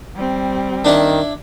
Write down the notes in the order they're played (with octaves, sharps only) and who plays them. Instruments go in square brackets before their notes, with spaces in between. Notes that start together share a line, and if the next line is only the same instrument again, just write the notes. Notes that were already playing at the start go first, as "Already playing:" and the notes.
[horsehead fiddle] G3 C4
[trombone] D#3 [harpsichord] D4 E4